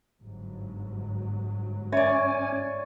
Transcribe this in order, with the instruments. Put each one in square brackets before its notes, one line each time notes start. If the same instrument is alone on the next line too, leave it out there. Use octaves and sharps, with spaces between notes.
[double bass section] G1 G#2 F#3
[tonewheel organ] C#4 G#5 [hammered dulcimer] C#5 D5 [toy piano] E5